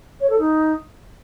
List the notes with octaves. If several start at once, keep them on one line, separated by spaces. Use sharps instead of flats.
C#5
A4
D#4